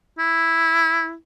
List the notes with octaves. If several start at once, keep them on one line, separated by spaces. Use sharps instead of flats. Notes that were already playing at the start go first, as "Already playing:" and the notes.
E4